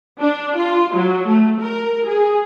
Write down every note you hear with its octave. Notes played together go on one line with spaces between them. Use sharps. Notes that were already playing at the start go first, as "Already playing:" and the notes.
D4
F4
F#3
A3
A#4
G#4